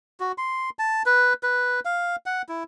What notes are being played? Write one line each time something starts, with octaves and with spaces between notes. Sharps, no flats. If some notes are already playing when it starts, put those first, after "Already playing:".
F#4
C6
A5
B4
B4
F5
F#5
E4